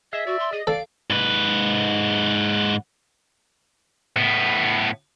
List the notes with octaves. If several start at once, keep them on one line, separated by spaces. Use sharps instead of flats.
G#4 D#5 E5
F#4 D5
C6
G#4 D#5
A4 D5 F5 D7
G#2 B4
A2 B3